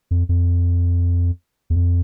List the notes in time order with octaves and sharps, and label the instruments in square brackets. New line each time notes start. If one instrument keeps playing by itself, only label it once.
[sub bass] F2
F2
E2
F2